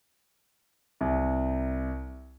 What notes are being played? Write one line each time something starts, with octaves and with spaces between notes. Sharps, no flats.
C2